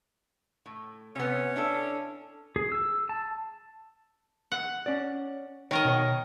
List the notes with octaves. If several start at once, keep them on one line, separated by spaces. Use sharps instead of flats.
A2
C3 B3 C#4
D4 E4 A4
G#4
E6
A5
F#5
C#4 D5
D#3 A#4 C#5 D#5
B2 C#5